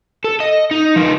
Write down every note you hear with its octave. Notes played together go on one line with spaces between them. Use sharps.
A4
D#5
D#4
F3 D#4